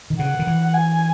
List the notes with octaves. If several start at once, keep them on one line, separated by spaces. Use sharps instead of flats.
D#3
C#3 F#5
D#3
E3
G#5